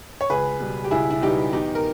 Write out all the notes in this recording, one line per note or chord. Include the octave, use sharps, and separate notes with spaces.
C#5
C#2 G#4 B4
B2 G3 B3
G4
C#2 E4 G#4
E4
B2 G3 B3 D#4 G4
E2 D#4 G4
A#4